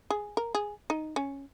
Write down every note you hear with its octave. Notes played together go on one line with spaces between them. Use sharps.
G#4
A#4
G#4
D#4
C#4